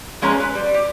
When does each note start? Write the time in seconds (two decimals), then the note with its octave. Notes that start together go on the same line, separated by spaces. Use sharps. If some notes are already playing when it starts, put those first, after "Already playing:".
0.22 F3 G#3 C#4 B4 A#5
0.40 B4
0.55 G3
0.74 G4